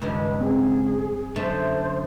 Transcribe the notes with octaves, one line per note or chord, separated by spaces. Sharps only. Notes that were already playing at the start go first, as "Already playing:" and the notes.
C#2 G2 D#3 F3 B4
C4 G#4
F#2 D3 A3 C5 A5